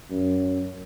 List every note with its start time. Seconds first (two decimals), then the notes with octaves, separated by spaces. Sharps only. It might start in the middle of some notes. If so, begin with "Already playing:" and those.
0.10 F#2